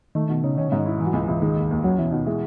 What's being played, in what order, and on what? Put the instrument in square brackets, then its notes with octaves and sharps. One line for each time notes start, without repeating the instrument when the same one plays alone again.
[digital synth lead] D#3 [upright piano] A3
[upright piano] B2 [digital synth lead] D#3
[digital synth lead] C#3 [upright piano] D#4
[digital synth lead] D#3 [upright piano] C#4
[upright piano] G#2 [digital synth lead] C#3
[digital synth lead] D#3
[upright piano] E4
E3
[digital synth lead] F#3
[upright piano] C#2 [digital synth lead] G#3
[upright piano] C#2 [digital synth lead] E3
[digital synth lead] D#3 [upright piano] G#3
[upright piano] D#2
D#2
[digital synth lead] F#3 [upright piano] C#4
[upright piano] B2 [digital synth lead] E3
[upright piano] B2 [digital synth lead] D#3
[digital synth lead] E3 [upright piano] G#3